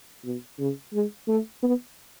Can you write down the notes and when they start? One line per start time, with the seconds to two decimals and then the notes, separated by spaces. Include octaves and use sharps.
0.25 B2
0.59 C#3
0.93 G#3
1.28 A3
1.63 B3